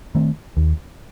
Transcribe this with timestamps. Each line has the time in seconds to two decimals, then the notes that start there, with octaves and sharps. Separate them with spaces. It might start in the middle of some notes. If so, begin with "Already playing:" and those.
0.15 D#3 A3 C4
0.57 D#2